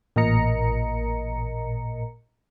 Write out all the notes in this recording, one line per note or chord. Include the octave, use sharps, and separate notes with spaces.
A1 A#2 A#4 D#5 A#5 C#7